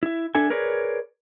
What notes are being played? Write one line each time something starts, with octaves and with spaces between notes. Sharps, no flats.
E4 E5
D4 A4 E5 G#5
G#4 A#4 B4 C#5 D5